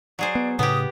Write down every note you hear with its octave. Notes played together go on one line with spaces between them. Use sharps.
F#3 G#4 C5 D5
B3
A2 C#3 B3 G4 D#6